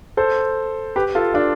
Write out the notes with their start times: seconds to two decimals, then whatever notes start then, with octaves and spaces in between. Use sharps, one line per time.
0.17 A4 C5
0.96 G4 B4
1.15 F4 A4
1.34 D4 F4